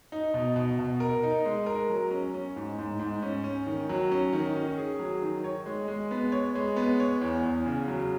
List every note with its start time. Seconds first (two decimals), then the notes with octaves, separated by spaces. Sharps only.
0.12 D#4
0.34 B2
0.56 B2
0.79 B2
1.00 A#4
1.23 D#4
1.45 G#3
1.66 A#4
1.90 F#3
2.11 C#4
2.34 C#4
2.56 G#2
2.78 G#2
2.99 G#2
3.22 C#4
3.44 C#4
3.67 D#3
3.89 F#3
4.12 C#4
4.33 D#3
4.56 C#4
4.78 G#4
4.99 F#3
5.22 D#3
5.44 C#5
5.66 G#3
5.88 G#3
6.11 B3
6.32 C#5
6.55 G#3
6.76 B3
7.00 C#5
7.21 E2
7.43 E2
7.66 C#3
7.88 F#3